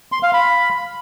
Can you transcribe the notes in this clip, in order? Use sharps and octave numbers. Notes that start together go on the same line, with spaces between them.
C6
F5
B5